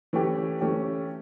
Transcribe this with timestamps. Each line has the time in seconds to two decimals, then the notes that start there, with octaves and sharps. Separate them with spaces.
0.13 E3 A3 C#4 G4
0.61 E3 A3 C#4 G4